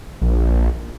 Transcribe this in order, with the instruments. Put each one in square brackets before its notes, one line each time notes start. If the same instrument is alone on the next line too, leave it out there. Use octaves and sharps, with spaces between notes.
[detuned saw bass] A#1